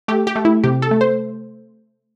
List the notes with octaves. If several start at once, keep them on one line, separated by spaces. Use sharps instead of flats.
A3 G4
G4
A3
E4
C3 G4
A4
A3
C5